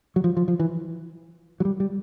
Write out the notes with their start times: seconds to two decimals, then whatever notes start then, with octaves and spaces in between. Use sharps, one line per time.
0.16 F#3
0.24 F3
0.37 F3
0.48 F3
0.60 E3
1.60 F#3
1.65 G3
1.80 G3